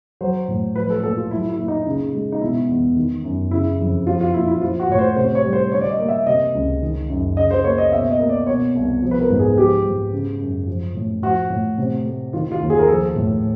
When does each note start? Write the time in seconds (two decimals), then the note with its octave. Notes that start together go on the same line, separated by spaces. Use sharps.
0.21 F#3 C5
0.48 A2
0.76 F3 B4
0.90 A4
1.03 A#2 A4
1.17 F4
1.31 F#3 E4
1.49 E4
1.58 A#2
1.68 D#4
1.86 C#3
2.14 G#3
2.32 D#4
2.41 B2 E4
2.69 E2
2.96 D#3
3.24 F#2
3.51 C#3 E4
3.79 F2
4.06 F3 F4
4.21 F4
4.34 A#2 E4
4.48 E4
4.61 F3 F4
4.80 F#4
4.89 A2 C#5
4.98 C5
5.16 C3 C5
5.35 C#5
5.44 G3
5.53 C5
5.72 D3 C#5
5.81 D5
5.90 D#5
5.99 A#3
6.09 E5
6.26 C3 D#5
6.55 C#2
6.82 D#3
7.10 F#2
7.37 C#3 D#5
7.51 C5
7.64 A#3 C#5
7.78 D#5
7.92 B2 E5
8.11 D#5
8.20 A#3
8.29 D5
8.47 B2 C#5
8.75 C2
9.02 F3
9.11 B4
9.21 A#4
9.30 G#2
9.39 G#4
9.57 F3 G4
9.85 G#2
10.12 C#3
10.40 F#2
10.67 F3
10.95 A2
11.23 F3 F#4
11.50 A2
11.78 C3
12.05 A3
12.33 D#3 F4
12.52 F4
12.60 D#2
12.70 G#4
12.79 A#4
12.88 F3 A4
13.16 A2